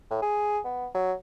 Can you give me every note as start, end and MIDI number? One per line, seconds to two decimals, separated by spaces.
0.10 0.18 45
0.22 0.59 68
0.65 0.87 59
0.95 1.13 54